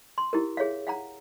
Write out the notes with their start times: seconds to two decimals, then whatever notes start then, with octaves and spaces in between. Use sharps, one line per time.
0.18 C6
0.33 E4 G4 A#4
0.57 G#4 C#5 E5 F5
0.87 F5 F#5 A#5